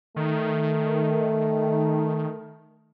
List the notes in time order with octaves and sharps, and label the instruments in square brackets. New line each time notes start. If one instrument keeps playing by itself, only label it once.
[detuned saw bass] D#3 [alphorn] A3